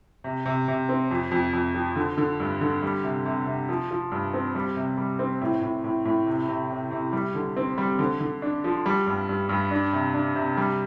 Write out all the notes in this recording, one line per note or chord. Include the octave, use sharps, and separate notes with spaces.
C3
C3
C3
C4
F2
F2
F2
F3
D3
D3
G2
D3
G3
C3
C3
C3
F3
F3
G2
C4
G3
C3
G3
C4
A2
A2
A2
A2
C3
C3
C3
C3
G3
D3
C4
G3
D3
D3
D4
F3
G3
G2
G2
G2
D4
C3
D4
C3
G3